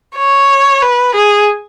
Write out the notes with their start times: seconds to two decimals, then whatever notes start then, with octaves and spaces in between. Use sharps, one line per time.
0.17 C#5
0.82 B4
1.15 G#4